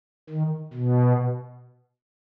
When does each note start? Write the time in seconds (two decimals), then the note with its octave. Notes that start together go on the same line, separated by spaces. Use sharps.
0.30 D#3
0.73 B2